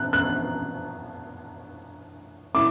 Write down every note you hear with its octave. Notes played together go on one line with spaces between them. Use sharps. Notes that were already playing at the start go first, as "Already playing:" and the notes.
Already playing: F#6
F#6
E4 D6